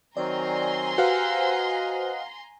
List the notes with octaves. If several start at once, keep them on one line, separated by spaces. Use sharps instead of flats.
D#3 F#3 C4 D5 G#5 A#5 C6
F#4 G4 B4 C5 F5 F#5 E6
D#5